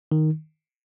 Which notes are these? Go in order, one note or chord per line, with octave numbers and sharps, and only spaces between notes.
D#3